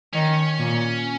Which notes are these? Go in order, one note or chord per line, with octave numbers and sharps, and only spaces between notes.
D#3 C#4
A#2